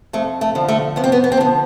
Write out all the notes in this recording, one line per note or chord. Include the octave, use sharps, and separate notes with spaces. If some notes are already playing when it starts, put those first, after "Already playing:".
F2 A3
A3
D3 F3
A3
F2 B3
C4
B3
B3
C4
D3 F3 B3